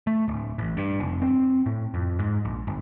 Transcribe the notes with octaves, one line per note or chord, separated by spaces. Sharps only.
A3
D1
A1
G2
F1
C4
A2
F2
G#2
A#1
G1